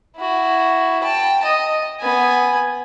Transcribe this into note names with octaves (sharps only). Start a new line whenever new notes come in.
E4 F#4
G5 A5
D#5
B3 G#5